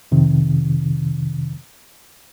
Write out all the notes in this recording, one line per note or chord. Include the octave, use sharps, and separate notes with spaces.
F2 C3 D#3